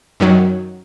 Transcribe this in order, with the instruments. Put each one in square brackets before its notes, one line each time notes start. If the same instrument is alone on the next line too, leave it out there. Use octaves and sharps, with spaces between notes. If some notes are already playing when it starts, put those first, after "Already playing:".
[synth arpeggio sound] F#2 D#3 F#3